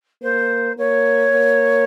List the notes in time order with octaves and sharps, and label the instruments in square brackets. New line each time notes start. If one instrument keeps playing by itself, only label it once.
[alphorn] A#3 [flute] C5
[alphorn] A#3 [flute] C#5
[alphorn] A#3